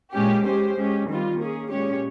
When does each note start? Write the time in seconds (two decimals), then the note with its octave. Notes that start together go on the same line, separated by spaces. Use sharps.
0.13 A#2 G#3 C#4 G4
0.45 G#3 C#4 G4 C5
0.77 G#3 C#4 G4
1.08 D#3 G3 C4 F4
1.39 A#3 C#4 G#4
1.70 A#2 G#3 C#4 G4 C#5